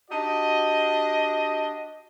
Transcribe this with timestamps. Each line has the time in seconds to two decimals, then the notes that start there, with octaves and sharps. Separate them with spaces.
0.10 D4 F#4 G4 D#5